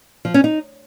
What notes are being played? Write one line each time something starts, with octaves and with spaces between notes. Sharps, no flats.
F3
C#4
D#4